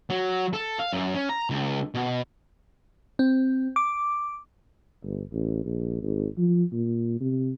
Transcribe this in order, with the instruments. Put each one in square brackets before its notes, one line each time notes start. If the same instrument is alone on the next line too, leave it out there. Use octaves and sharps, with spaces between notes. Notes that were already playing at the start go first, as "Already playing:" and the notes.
[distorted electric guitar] F#3
A4
F5
F#2
C#4
A#5
C#2
B2
[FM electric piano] C4
D6
[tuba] G1
A1
A#1
G#1
F3
A#2
C3